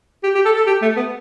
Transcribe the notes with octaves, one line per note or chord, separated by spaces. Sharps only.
G4
G4
A4
A4
G4
A3
B3